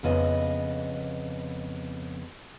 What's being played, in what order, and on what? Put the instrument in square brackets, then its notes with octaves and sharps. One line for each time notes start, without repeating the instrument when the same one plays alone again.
[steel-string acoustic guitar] F2 C#3 B3 D#5